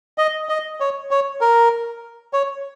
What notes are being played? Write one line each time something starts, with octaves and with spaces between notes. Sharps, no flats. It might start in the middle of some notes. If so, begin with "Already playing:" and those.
D#5
D#5
C#5
C#5
A#4
C#5